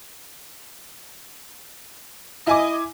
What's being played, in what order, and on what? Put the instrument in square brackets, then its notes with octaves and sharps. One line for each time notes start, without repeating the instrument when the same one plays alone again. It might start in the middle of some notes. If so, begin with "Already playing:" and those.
[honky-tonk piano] E4 G#5 D6 [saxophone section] D#5